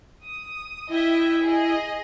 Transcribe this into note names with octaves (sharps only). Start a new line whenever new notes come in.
D#6
E4 D#5 E5 G5
G#4 D#5